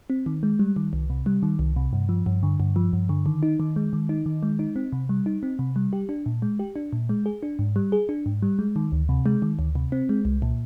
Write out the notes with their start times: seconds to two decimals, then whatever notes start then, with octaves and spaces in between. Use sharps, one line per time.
0.10 C4
0.26 D#3
0.43 G#3
0.59 G3
0.76 D#3
0.93 C2
1.10 C3
1.26 G3
1.43 D#3
1.59 C2
1.76 C3
1.93 G2
2.09 F3
2.26 G2
2.43 D3
2.60 G2
2.76 F3
2.93 G2
3.09 D3
3.26 D#3
3.43 D#4
3.60 D#3
3.76 G#3
3.93 D#3
4.09 D#4
4.26 D#3
4.43 G#3
4.59 D#4
4.76 C4
4.92 C3
5.09 G3
5.26 D#4
5.43 C4
5.59 C3
5.76 G3
5.93 G4
6.09 D4
6.26 A#2
6.42 G#3
6.59 G4
6.76 D4
6.93 A#2
7.09 G#3
7.26 G#4
7.43 D4
7.59 G#2
7.76 G3
7.92 G#4
8.09 D4
8.26 G#2
8.42 G3
8.59 G#3
8.76 D#3
8.92 D2
9.09 C3
9.26 G#3
9.42 D#3
9.59 D2
9.75 C3
9.92 C4
10.09 G#3
10.25 C2
10.42 A#2